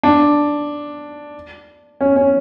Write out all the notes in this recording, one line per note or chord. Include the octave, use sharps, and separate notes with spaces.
D4
C#4
C#4